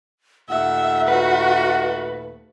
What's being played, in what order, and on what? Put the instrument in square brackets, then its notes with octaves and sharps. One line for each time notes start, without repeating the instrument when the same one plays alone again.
[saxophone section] D#2 A#2 A3 [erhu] E5 [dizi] F#5
[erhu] F#4 [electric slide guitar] B4